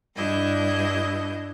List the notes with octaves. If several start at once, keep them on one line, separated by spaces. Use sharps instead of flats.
G2 D4 E4 D#5 G6